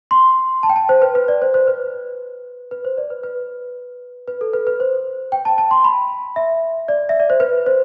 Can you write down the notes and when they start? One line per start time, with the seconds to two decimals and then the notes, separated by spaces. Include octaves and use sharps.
0.11 C6
0.63 A5
0.69 G5
0.76 A5
0.89 C5
1.02 B4
1.15 B4
1.28 D5
1.42 C5
1.54 C5
1.67 B4
2.71 B4
2.85 C5
2.98 D5
3.10 B4
3.23 B4
4.28 B4
4.41 A4
4.53 B4
4.67 B4
4.80 C5
5.32 G5
5.45 A5
5.58 A5
5.71 C6
5.84 B5
6.36 E5
6.88 D5
7.09 E5
7.20 D5
7.30 C5
7.40 B4
7.66 C5